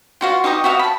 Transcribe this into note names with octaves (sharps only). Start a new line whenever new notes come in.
F4 F#4 F5
D#4 G4 C#6 D#6
F#4 E5 F5 D#6
A5 B5